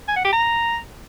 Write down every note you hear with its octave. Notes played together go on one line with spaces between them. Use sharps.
G#5
F#5
G4
A#5